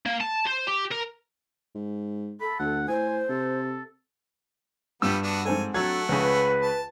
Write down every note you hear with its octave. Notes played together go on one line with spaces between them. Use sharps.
A#3
A5
C5
G4
A#4
G#2
A4 B5
D2 F#5
A2 C5 G#5
C3 A4
G2 F3 G3 B3 E6
B3 D4 F#4
G#2 C4 A4 G#5
F#3 A3 C4 D4 A4 F#5 G#6
C#2 C#3 B4
A5